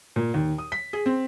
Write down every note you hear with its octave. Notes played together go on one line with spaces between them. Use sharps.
A#2
D#2
D#6
B6
G#4
C4